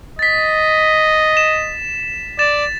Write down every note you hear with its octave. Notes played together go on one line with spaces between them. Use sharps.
D#5 A6 B6
E7
D5 A6 E7